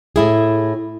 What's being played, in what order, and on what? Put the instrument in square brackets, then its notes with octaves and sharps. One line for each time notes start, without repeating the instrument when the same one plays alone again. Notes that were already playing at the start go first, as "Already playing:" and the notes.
[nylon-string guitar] A2 E4 G#4